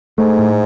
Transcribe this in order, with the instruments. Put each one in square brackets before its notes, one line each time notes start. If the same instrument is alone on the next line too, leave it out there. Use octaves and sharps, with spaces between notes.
[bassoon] G#2 [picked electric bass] A3
[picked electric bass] A2